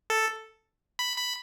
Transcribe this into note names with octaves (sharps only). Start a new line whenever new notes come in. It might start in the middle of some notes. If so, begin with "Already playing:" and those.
A4
B5
B5